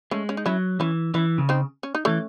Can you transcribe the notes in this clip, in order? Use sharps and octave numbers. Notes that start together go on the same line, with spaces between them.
G#3 A3 C#4
C#4
D#4
F#3 C#4 E4
E3 C#4 E4
E3 C#4 E4
C#3
C4 D#4
C#4
D#4
E3 A3 C#4